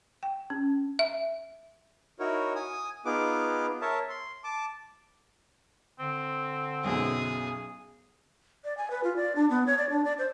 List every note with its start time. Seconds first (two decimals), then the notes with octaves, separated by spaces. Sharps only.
0.23 G5
0.50 C#4
0.99 E5
2.19 D#4 E4 F#4 A#4 C#5
2.56 G#5 D#6
3.05 B3 D#4 F4 G#4 B4 D6
3.82 A#4 C#5 E5 A5
4.09 C6
4.44 A5 D6
5.99 D3 C4
6.84 B1 F#2 B2 G#4
8.64 D5
8.77 G#5
8.91 B4
9.04 F4
9.16 D5
9.36 D4
9.50 B3
9.67 C#5
9.78 D5
9.90 D4
10.05 D5
10.18 C5